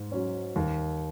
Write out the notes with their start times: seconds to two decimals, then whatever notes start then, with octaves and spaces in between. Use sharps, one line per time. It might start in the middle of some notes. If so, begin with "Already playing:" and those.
Already playing: G#2
0.12 F#3 C#4
0.56 D#2